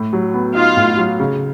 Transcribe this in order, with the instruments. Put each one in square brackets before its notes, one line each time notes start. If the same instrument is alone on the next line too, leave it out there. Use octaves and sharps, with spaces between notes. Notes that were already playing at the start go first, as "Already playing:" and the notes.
Already playing: [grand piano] A2
F#3
B3
[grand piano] D#4 [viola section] F4 F5
[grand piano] A2
F#3
C#3